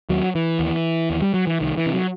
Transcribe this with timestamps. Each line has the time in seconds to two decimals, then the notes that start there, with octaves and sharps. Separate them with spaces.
0.09 D#2 F#3
0.35 E3
0.59 D#2
1.10 D#2
1.22 G3
1.34 F#3
1.47 E3
1.60 C2 D#3
1.78 E3
1.86 C3
1.94 F#3